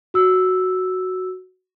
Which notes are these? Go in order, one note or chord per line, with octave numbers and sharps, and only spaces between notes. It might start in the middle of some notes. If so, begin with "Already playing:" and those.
F#4 E6